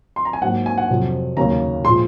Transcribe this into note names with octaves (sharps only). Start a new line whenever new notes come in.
C6
A#5
G#5
G#2 F#3 A#3 F#5
G#5
F#5
F2 C3 F#3
D#2 C#3 F#3 A#3 C#4 A#5
A#2 F3 G#3 C6